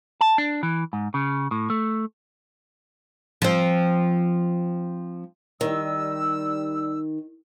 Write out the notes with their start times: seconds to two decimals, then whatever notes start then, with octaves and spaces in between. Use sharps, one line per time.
0.21 A5
0.38 D4
0.63 E3
0.93 G#2
1.14 C#3
1.51 A2
1.70 A3
3.42 F3 C4
5.61 D#3 G3 E6